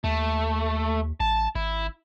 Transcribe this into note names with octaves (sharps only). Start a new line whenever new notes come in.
D#2 A3
A1 A5
G#1 E4